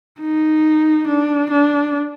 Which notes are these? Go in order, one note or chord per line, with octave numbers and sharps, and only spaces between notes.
D#4
D4
D4